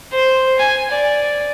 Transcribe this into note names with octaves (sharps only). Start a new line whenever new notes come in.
C5
G#5
D5